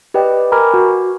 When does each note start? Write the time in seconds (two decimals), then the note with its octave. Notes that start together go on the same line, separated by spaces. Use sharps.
0.14 G4 B4 D5 D#5 G5
0.52 A#4 G#5 A#5 B5 D6 F6
0.74 F#4